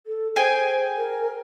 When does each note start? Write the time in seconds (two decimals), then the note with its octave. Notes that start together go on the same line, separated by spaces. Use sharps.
0.06 A4
0.36 G#4 C5 G5 G#5
0.97 A#4